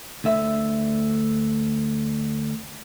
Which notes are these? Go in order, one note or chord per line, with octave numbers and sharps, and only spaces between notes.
D2 D3 E5